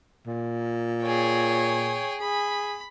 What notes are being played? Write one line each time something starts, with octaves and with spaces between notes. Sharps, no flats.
A#2
G#4 C#5 G5
G#4 B5